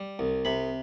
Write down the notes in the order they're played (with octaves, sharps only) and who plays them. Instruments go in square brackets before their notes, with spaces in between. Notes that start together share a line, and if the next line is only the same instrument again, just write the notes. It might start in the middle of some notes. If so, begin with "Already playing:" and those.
Already playing: [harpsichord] G3
C2
C3 B5